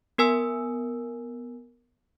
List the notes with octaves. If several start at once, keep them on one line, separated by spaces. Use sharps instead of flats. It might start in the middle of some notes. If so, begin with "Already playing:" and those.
B3 A#4 G#5 E6